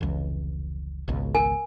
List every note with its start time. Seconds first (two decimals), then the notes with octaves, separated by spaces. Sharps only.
0.01 F1 C#2 E3
1.08 G#1 C#2 B2
1.35 A#4 G#5